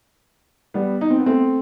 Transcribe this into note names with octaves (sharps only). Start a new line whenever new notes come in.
G3 B3
D#4
C4
B3
A3 C4